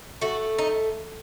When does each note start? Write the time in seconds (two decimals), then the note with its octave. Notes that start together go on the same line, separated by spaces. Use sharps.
0.21 A3 F#4
0.58 D#4